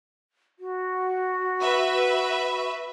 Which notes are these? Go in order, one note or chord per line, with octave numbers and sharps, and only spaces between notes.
F#4
B4 E5 B5